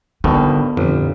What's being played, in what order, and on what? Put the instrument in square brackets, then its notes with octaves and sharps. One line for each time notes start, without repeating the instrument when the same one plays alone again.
[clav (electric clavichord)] G#1 G2 B2 [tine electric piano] D3 [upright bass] B3
[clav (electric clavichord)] G1 [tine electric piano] F2 [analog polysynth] A#2 D3 E3